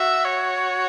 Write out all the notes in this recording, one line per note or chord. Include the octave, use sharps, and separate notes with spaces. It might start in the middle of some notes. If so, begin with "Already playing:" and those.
Already playing: F#4 E5
C#5